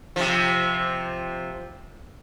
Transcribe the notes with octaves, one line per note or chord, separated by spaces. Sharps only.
C3 F3